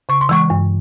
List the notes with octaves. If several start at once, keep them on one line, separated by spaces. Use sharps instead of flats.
C#3 C#6
C6
E3 G#3 C#6
G2